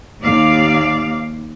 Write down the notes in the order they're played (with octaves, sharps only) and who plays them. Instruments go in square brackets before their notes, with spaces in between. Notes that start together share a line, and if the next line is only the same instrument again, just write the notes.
[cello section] D#2 D5 F5